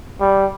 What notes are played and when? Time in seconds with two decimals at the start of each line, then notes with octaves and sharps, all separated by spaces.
0.20 G3